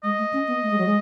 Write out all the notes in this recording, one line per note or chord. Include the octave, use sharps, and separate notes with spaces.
G#3 D#5
A3
C#4
B3
A3
G#3
F#3
G#3